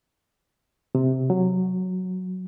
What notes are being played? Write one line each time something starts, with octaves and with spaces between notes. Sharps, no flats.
C3
F#3